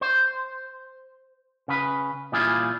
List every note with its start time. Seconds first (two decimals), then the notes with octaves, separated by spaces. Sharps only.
0.01 C5
1.68 C#3 B4
2.32 A#2 E3 G3 E4 F4 G#4